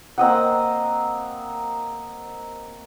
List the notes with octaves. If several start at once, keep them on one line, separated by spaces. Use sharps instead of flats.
A#3 C4 D#5 F#5